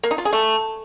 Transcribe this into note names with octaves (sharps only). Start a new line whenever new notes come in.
A#3
D#4
F4
G#4
A3